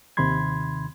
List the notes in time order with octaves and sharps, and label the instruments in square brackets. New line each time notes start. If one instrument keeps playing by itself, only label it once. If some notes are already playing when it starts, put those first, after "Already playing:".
[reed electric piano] D#2 C3 D#3 B5 C6 G#6